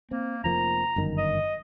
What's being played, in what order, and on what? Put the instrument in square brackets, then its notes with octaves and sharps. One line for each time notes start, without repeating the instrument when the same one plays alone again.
[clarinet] A#3 [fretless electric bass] C4
[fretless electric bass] F1 F3 A#3 [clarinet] A#5
[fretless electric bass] G1 F#2 D#3
[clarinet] D#5